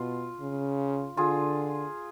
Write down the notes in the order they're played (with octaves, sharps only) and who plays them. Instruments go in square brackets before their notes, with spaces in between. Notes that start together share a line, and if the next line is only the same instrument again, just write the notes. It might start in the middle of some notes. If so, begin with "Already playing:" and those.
Already playing: [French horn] B2 [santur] F4
[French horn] C#3
[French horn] D3 [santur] F4 G#4